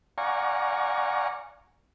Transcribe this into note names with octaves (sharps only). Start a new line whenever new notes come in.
D5 F5 F#5 G#5 A#5 C#6